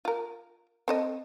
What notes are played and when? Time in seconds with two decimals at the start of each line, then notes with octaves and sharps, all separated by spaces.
0.05 F4 A#4
0.88 C4 A4 D#5